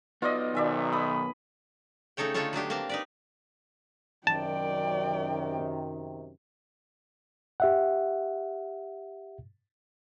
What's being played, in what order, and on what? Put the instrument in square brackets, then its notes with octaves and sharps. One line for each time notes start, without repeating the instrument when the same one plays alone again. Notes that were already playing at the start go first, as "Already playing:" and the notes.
[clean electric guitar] B3 D#4 [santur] F4 D5 D#5
[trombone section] B1 D#3 [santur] D5 E5 G#5
[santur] B5 D#6
[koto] C#3 A3 D#4 A4 C#5 G5
D3 A3 D#4 F4 A4 C#5
F#3 B3 D4 G4
A#3 C4 F5 A5
D#4 B4 D5
[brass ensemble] F#2 C3 D#3 [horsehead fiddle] D5 G5 [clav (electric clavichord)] A5
[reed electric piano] G4 E5 F#5